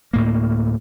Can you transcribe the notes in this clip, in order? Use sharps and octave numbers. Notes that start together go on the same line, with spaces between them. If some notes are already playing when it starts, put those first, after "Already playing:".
D2 A2 A#3